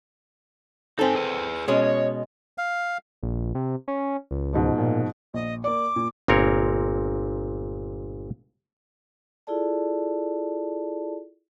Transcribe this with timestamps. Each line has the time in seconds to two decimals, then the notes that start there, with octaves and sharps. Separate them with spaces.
0.99 C4 D#4 A4 G#5
1.15 G#4 B4
1.68 B2 G#3 C#4 C#5
2.58 F5
3.23 A#1
3.55 C3
3.88 C#4
4.31 C#2
4.53 G#2 B2 F3
4.78 A#2
5.34 A#1 D#5
5.64 A#3 D5 D6
5.96 A#2
6.28 G1 A#2 C4 A#4 C#5
9.47 E4 F4 G#4 A4 D5 A5